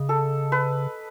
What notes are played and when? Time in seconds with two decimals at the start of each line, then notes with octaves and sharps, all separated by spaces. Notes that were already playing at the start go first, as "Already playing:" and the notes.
Already playing: C#3 D#5
0.09 A4
0.52 B4